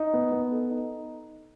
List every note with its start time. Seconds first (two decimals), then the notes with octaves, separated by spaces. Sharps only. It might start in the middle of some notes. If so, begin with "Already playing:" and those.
Already playing: D#4
0.14 B3
0.32 B3
0.52 A4
0.70 D#4